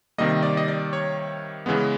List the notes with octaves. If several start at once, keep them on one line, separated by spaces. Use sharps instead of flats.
C3 D#3 G3 A#3 D#5
D5
D#5
D5
C#5
C#3 E3 G#3 B3